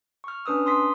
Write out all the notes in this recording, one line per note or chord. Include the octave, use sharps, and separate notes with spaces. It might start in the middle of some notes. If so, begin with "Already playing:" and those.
C#6 F6
C#4 D4 B4 D#6 E6
C6 D#6 B6